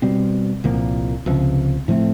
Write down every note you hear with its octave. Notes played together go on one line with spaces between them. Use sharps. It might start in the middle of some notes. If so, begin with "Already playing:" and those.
B2 G3 C4
C2 A#2 F3 A#3
C#2 C3 F3
A2 F3 A3 C4